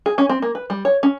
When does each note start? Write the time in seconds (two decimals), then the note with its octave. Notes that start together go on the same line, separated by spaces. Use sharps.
0.06 G#4
0.18 C#4
0.29 C4
0.42 A#3
0.55 B4
0.70 G3
0.85 C#5
1.03 C#4